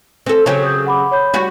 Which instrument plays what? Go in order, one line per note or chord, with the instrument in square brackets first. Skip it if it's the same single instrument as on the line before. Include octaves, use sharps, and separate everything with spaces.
[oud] C4 A4
[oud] C#3 F#3 G4 [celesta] C#5
[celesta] D#6 G6
F#5 B5 D6
C#5 B5 G6
[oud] G3 F#4